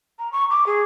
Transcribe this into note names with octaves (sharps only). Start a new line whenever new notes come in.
A#5
C#6
D6
G#4